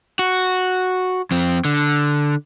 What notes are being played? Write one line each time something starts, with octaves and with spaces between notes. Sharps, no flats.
F#4
F2 C4
D3